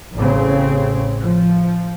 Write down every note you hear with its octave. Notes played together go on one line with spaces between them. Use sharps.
A1 C#3 C4
F3